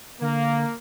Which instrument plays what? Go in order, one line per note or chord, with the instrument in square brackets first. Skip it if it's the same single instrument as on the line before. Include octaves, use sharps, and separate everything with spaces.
[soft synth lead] D3 [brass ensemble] A#3